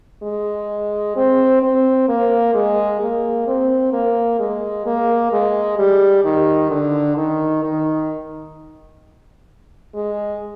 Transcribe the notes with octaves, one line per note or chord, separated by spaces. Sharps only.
G#3
C4
C4
A#3
G#3
A#3
C4
A#3
G#3
A#3
G#3
G3
D#3
D3
D#3
D#3
G#3